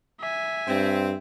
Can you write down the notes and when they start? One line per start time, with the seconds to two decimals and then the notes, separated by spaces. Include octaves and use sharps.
0.20 E5 G#5
0.68 G2 C4